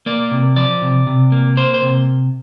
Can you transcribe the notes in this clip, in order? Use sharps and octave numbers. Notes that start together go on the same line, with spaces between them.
A#3 D5
C3
F3 D5
C3
C3
A#3
A#3 C5
C5
C3